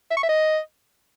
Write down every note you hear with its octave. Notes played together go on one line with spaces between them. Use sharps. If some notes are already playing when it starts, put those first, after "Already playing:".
E5
C#6
E5
D#5